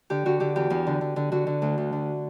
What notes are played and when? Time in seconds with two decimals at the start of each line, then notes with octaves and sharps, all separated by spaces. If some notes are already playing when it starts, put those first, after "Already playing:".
0.10 D3 G4
0.25 D3 F#4
0.40 D3 G4
0.56 E2 G4
0.70 E2
0.87 D3
1.01 D3
1.16 D3
1.32 D3 F#4
1.47 D3
1.62 D2
1.78 D2
1.93 D3